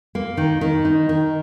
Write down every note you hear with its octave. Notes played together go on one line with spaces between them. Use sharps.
A#3
D#3
D#3
D#4
D#3